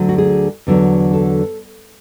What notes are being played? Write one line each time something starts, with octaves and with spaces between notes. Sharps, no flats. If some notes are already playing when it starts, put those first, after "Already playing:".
Already playing: D2 D3 F#3
F#4
G#4
E2 D3 F#3
A4